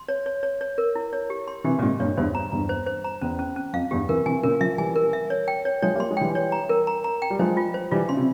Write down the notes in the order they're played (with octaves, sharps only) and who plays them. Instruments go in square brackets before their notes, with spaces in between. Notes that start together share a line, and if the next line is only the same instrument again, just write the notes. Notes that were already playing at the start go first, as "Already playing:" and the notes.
Already playing: [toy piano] C6
C#5
C#5
C#5
C#5
A#4
E4
C#5
G4
C6
[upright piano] C3 E3 [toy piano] G4
[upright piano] A#2
[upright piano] G#2 C3 [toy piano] G4
[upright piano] G2 A#2 [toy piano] C#5
[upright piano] E2 G2 [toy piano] C5
[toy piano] A#5
[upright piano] E2 G2 [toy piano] A#5
[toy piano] C5
C5
A#5
[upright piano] E2 [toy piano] C#4
[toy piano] C#4
C#4
[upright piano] F2 [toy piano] F5
[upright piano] E2 G2 [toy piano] G4
[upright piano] C3 E3 [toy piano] A#4
[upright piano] C3 E3 [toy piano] G#5
[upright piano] A#2 C#3 [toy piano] A#4
[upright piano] C#3 F3 [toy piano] E5
[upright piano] E3 G3 [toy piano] G#5
[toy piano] A#4
E5
C#5
G5
C#5
[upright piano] F3 G#3 [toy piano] C#5
[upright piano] G3 A#3
[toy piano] C6
[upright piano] G#3
[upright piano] E3 G3 [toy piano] G5
[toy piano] C#5
A#5
A#4
A#5
A#5
G5
[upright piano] G3
[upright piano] F3 G#3 [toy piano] C5
[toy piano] F4
C5
[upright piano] E3 G3 [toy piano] F4
[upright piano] C#3 [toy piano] C6
[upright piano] C3